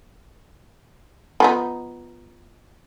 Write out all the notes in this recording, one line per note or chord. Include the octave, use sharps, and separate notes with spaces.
F3 B3 D#4